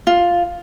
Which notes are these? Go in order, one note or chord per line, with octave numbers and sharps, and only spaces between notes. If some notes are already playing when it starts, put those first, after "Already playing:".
F4